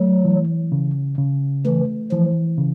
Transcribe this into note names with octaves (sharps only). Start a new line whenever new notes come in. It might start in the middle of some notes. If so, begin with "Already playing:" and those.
Already playing: F#3 A3
E3
C#3
C#3
E3 A3
E3 F3
C#3